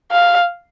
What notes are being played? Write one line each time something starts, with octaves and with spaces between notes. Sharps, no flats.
F5